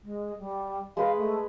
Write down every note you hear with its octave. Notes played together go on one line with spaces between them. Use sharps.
G#3
G3
G#3 B4 D#5 F5
A3